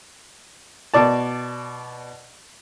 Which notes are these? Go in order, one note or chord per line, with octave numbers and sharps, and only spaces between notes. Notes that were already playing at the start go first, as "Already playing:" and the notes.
B2 D5 A5